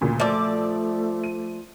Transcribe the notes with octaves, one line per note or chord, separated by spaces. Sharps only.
D2 A#2 C#3
F3 A3 D5 E5 D6 E6
D#7